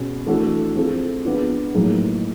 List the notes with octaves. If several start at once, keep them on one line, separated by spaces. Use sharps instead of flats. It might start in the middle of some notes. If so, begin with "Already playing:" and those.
Already playing: B2 G#3 C#4
E3 A3 D4 F#4 A4
G#3 C4 F4 A4
G#3 B3 D4 F4
A2 F#3 A#3 D#4 G#4